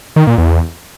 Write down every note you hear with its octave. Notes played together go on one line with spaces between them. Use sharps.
D#3
A#2
E2